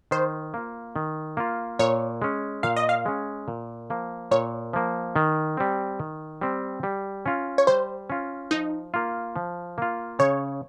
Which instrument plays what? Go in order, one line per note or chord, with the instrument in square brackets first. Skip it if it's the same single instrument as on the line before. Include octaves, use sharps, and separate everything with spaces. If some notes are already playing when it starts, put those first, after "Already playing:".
[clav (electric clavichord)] D#3 [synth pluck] C5
[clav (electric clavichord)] A#3 F4
D#3
A#3 F4
[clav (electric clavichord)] A#2 [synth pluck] C#5
[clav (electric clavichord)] G#3 C#4
[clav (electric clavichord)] A#2 [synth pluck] F5
[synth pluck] D#5
F5
[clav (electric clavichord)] G#3 C#4
A#2
F3 A#3
[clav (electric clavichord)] A#2 [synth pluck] C#5
[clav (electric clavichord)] F3 A#3
D#3
G3 C4
D#3
G3 C4
G3
C#4 F4
[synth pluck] C#5
[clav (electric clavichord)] G3 [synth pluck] C5
[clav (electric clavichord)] C#4 F4
[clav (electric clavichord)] F3 [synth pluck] D#4
[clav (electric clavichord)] A#3 F4
F3
A#3 F4
[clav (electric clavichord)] C#3 [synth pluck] C#5